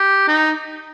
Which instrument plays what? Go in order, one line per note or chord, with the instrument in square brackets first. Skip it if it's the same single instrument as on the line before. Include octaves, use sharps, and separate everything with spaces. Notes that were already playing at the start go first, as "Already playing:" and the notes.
Already playing: [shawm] G4
D#4